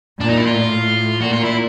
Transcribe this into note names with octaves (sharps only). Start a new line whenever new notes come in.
A#2 D4
D#4
E4
F4
A2
A#2 F#4
F4
E4